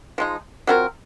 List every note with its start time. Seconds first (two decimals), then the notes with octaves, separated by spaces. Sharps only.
0.18 F3 G#3 D#4
0.67 F#3 C4 F4 A#4